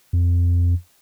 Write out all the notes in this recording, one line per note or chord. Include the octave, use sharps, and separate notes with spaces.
F2